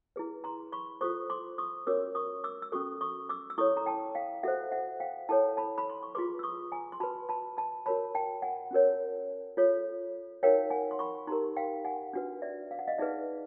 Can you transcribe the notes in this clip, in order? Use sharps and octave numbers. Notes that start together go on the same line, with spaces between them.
E4 G#4 B4
A#5 C6
B5 C#6
F4 A4 C5 C#6 D#6
C6 D6
C#6 D#6
C#4 F#4 A#4 C#5 D6 E6
C#6 D#6
D6 E6
E6
C#4 F#4 A4 C#6 D#6
C#6 D#6
D6 E6
E6
E4 A4 C#5 C#6 D#6
A#5
G5 A5
F5 G5
F#4 A4 C5 E5 F#5
E5 F#5
F5 G5
E4 A4 C#5 G5 A5
A5 B5
B5
C6
C#6
F4 G#4 B4 C6 D6
E6
C#6 D#6
G#5 A#5
C6
F#4 B4 A5 B5
A5 B5
A5 B5
F#4 A#4 C#5 A5 B5
G5 A5
F#5 G#5
C#4 F#4 A#4 C#5
F4 A4 C#5
D#4 F#4 A#4 C#5 F5 G5
F#5 G#5
C6
B5 C#6
D#4 G4 A#4 A#5 C6
F5 G5
F#5 G#5
D4 F#4 B4
D5 E5
F5
F#5
D#5 F5
D#4 G#4 B4 D5 E5